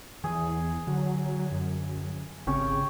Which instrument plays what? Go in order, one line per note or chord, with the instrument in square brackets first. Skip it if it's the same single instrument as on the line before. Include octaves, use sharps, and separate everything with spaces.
[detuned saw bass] E2 [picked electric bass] E3 [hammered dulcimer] G#4
[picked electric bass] D3 [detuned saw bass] F#3
[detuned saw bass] F#2
[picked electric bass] G#1 C4 C#4 [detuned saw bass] C#3 [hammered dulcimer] G4 C#5